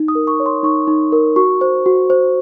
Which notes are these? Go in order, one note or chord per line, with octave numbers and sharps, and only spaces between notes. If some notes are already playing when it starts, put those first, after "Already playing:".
Already playing: D#4
D#6
A#4
C#6
C#5
C6
D#4 C#6
D#4
A#4
F#4 C#6
C5
F#4
C5